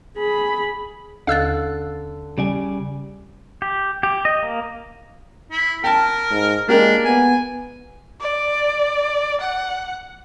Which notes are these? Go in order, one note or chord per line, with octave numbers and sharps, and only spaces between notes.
G#4 B5
D#2 D3 F5 E6 F#6 A6
C#3 G3 D5 G#5
G4
G4
D#5
A#3
E4
A#4 G5 A5
G#2
G#3 A#3 D4 G4 A#4
B3 G#5
D5
F#5